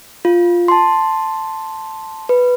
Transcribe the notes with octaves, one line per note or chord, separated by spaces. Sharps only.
F4
A5 C6
B4